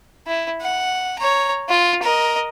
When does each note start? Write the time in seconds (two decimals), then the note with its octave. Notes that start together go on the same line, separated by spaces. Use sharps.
0.27 E4
0.61 F#5
1.19 C#5 A#5
1.69 F4
2.02 A#4 D#5